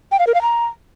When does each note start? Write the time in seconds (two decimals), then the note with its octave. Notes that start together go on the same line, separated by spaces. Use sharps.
0.12 G5
0.19 F5
0.27 A#4
0.34 F5
0.42 A#5